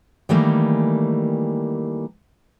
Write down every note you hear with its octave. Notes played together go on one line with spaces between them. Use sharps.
D#3 E3 G3 A3 A#3